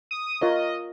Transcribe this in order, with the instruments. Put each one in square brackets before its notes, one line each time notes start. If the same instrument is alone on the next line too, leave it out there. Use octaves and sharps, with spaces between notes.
[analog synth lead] D#6
[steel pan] F4 A#4 C#5 [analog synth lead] D#5